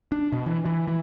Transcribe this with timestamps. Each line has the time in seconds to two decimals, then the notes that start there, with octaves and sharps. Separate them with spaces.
0.12 D4
0.32 B2
0.46 E3
0.65 E3
0.87 E3